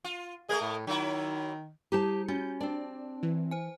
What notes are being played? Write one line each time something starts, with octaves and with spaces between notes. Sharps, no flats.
F4
A3 G#4 A#4 D#5
A2
D#3 F#3 E4
G3 E4 G4 A5 A#5
C#4 F#4 G6
C4 D4 D5 A5
E3
C5 G#5